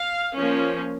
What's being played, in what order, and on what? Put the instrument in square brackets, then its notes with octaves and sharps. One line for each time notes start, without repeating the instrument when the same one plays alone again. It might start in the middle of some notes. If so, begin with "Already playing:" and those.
Already playing: [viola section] F5
F3 A#3 C#4